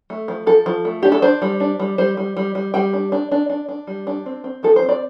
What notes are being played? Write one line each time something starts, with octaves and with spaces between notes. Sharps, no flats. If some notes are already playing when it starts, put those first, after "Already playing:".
A3
F3
F3 A4
F3
A3
D4 G4
A4
D4 C5
G3
D4
G3
G3 C5
G3
G3
G3
G3 G5
D4
D4
D4
D4
D4
G3
D4
C4
C4
F3 A4
C5
C4
D5